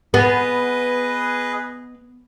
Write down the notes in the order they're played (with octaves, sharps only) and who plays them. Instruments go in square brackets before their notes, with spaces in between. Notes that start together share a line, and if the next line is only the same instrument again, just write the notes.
[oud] B3 [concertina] G#4 B4 D#5